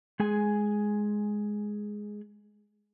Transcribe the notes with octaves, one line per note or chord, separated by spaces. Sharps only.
G#3 G#4 G#5